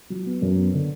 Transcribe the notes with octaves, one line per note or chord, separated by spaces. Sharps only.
F#3
B3
F#2
B3
D3